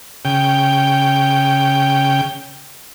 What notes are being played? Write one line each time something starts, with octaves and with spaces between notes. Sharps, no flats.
C#3 G5